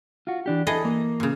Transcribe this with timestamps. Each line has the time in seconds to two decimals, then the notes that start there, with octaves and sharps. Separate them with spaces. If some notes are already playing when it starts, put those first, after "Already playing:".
0.27 F4 F#4
0.46 E3 D4 G4
0.67 E2 E3 G#4 A4 D#5
0.85 A#3
1.20 A#2 C#3